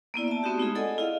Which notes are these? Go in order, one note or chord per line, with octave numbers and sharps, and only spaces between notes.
A#3 B3 E4 D5
E5 A5
A3 B3 C4 D#4 F#4 G4
G#3 D#4 F4 G#4
G#4 A4 D5 D#5 F#5 G#5
E4 F4 D#5 F5